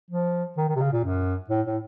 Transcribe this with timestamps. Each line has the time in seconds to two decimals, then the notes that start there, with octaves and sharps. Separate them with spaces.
0.10 F3
0.57 D#3
0.68 D#3
0.75 C3
0.81 C#3
0.92 A#2
1.04 F#2
1.49 A2
1.66 A2